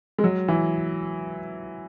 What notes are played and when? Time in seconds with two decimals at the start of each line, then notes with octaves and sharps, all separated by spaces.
0.18 G#3
0.24 F#3
0.48 E3